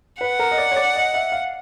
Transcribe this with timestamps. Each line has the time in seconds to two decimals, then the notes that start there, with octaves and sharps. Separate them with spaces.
0.21 B4 F#5
0.39 A#4
0.52 D#5
0.58 D5
0.72 C#5
0.76 D5
0.96 D#5
1.14 E5
1.32 F5